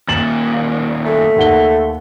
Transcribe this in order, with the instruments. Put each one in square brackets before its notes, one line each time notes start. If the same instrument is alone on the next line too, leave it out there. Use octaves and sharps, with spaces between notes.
[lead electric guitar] D#2 A#2 [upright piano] A6 E7 F#7
[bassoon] A3
[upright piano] D#2 F#5 G7